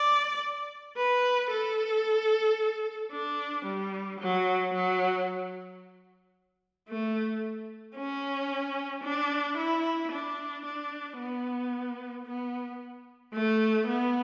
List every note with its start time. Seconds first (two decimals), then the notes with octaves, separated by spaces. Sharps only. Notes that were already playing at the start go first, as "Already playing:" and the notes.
Already playing: D5
0.97 B4
1.51 A4
3.12 D4
3.66 G3
4.20 F#3
4.74 F#3
6.89 A3
7.96 C#4
9.04 D4
9.57 E4
10.11 D4
10.65 D4
11.18 B3
12.26 B3
13.34 A3
13.87 B3